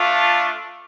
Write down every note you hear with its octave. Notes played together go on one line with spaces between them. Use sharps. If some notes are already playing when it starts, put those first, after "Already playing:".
Already playing: A3 D4 F4